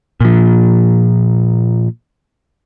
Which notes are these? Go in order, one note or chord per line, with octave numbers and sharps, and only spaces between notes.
A#2 F3